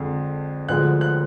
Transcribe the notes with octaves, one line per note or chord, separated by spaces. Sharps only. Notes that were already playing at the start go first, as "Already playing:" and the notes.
Already playing: F2 D3 G#3
D2 D3 F3 G#3 F#6
F#6